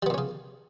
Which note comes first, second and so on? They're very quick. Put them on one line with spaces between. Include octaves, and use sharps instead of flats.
G3 B3 A#2 C#4 C#3